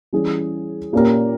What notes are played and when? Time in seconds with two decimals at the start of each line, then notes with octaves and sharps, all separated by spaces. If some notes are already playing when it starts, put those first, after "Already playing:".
0.13 E3 G3 C#4 G#4
0.93 A#2 A#3 C#4 G4 A#4